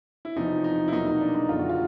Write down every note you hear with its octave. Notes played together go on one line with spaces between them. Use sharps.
E4
E2 C3 F3 D#4
D#4
E4
E2 B2 F#3 A#3 D#4
D#4
D4
D#4
F#1 F#2 D3 F4
F#4
F4